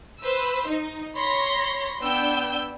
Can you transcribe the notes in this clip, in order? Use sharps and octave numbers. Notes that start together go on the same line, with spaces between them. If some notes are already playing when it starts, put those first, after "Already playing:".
B4 C5 E6
D#4
C#5 B5 C6 A#6
B3 D4 G5 E6 G6